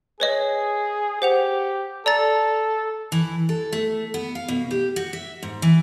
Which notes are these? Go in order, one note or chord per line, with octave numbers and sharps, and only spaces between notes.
G#4 B4 C#5 D#5
G4 C5 F#5 F7
A4 D5 A#5 A6
E3
A4
A3
B3
F5
B2
G4
F#4
E5
G#2
E3